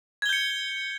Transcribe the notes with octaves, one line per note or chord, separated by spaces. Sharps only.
G6 G#6 C#7 G7